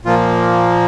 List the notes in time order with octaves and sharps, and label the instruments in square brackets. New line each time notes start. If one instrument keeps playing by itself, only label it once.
[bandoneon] A#2 F3 A#3 F4